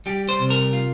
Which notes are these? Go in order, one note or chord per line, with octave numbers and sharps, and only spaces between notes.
G3 G4
C5
C3
A#4
F4